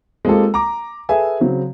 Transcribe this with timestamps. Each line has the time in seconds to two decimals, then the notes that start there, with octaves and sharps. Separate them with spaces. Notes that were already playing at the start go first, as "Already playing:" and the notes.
0.25 G#3 A#3 C4 F4 G4 A4
0.54 A#5 D6
1.09 G#4 A4 B4 E5 G#5
1.40 C#3 F#3 C4